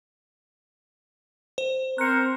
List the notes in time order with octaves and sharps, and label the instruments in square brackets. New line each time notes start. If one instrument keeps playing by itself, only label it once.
[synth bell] C5
[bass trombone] C4 [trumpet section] A#4 C5 [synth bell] F#6 C#7